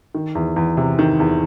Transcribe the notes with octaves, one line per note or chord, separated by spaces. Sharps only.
D#3
E2
E2
C3
D#3
E2